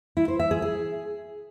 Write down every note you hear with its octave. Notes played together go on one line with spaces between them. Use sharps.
E4
C5
E5
G#4
G#4